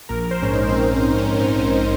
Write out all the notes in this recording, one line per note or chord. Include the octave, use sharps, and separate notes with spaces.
A#1 A#4
C5
G#2 C#4
D#4
C4
A#1 C#4
C4
G#2
C#4
G#2 D#4
C#4